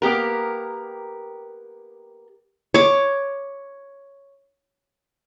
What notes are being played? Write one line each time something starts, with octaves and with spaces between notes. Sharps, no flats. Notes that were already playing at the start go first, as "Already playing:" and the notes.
A#3 B3 G4 A#4
C#5 D6